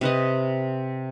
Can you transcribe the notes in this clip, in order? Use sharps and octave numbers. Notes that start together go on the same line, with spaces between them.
C3 B4 D#5